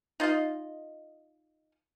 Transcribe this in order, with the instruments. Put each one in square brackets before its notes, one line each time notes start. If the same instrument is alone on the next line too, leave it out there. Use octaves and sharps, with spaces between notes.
[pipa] D#4 F4 D#5 F5